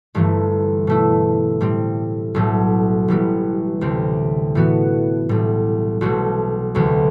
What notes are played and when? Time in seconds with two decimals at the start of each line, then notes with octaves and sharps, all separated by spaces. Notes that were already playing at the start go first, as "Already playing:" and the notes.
0.15 G1 G2 E3 A3
0.87 B2 A3 E4
1.61 A2 G3 C4
2.34 B1 A2 F#3 A3
3.08 A1 A2 E3 G3 B3
3.81 D2 C3 G3 C4
4.55 A2 E3 B3 F#4
5.29 B1 A2 G3
6.01 B1 B2 A3 C4 F#4
6.75 E1 D2 C3 F#3 B3